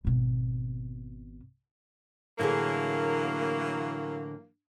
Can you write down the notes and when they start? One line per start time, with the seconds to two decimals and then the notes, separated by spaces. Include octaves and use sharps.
0.05 G#1 B2
2.39 A2 D3 E3 F#3 A#3 G#4